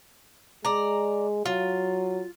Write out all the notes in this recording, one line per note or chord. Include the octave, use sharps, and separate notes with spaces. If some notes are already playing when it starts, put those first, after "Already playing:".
G#3 D5 A#5
F#3 F4